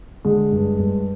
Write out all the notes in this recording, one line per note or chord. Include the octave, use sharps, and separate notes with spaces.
D3 G#3
G2
G2